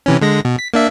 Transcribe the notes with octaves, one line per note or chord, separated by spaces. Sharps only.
C3 E3 C#4
D3 G#3 A#6
B2
B6
A#3 D4 E5